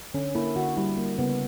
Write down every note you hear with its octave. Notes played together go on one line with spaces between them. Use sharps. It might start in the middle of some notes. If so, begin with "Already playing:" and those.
D3 C#4
A#3 E4
D3 F#4
G3 E4
A#3
C#3 B3